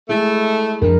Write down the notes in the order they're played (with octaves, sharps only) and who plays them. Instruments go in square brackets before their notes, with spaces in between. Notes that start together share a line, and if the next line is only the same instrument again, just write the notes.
[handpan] G#3 E4 G#4 [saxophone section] A3
[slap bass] F2 F3 G3 [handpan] D4 A#4